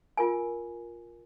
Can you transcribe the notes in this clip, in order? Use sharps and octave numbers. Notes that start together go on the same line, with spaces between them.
F4 A#4 G#5